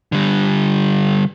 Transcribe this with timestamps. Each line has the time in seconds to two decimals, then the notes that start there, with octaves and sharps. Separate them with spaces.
0.12 D3 G3